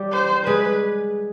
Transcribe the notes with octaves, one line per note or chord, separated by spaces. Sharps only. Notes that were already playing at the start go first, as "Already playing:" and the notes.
Already playing: G3 G4
C5
G#3 G#4 B4